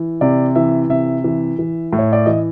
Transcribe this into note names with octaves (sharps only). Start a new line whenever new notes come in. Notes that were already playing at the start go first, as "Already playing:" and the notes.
Already playing: E3
C3 D5
E3 E5
C3 E5
E3
E3
A2
C#5
D5
E3 D#5